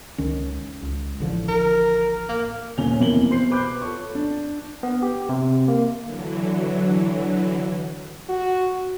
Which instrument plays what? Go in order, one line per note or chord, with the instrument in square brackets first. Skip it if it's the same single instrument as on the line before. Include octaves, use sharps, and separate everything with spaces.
[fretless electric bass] C#2 D#3 C#4
C#2
A1 D3 F3
[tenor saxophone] A#4
A#3
[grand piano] D#1 A#2 C#4 G#5 F7 G7
F2 B2 E3 A#3 F#7 G7
B2 C5 C7
B4 B5 D6 F#6 G6
F4 A4 C#5 C#6
D4
[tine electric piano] B3
G4
C3
A#3
[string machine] D3 E3 F#3
[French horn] F#4